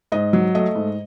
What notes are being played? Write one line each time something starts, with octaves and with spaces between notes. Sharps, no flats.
G#2 D#5
F#3
A3 D#5
G#2